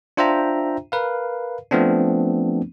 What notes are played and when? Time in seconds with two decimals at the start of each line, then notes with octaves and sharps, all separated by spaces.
0.17 D4 F4 C5 E5 G5 A#5
0.92 A#4 B4 F5
1.71 F3 A3 B3 C4 D4